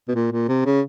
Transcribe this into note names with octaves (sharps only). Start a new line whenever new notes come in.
B2
A#2
A#2
C3
C#3